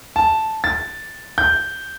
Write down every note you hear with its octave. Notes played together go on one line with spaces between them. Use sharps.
A5
A6
G6